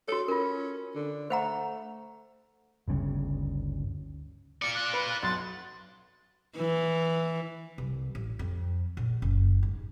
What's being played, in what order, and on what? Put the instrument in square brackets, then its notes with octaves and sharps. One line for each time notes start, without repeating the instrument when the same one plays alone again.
[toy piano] F#4 C#5 [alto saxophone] A4
[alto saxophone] C#4 [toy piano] F4 A#4
[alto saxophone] D3
[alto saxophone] A3 [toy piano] C5 F#5 A#5
[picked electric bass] G1 D2 C#3 G3
[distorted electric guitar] F4 D5 [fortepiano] D6 [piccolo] C#7
[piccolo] F#6
[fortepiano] B4
[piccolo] F#6
[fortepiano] B1 C6 [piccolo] A6
[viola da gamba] E3
[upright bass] C2
A1
F2
A#1
F#1
G#2